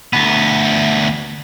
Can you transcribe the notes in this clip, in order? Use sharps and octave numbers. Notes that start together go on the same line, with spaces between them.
D2 B3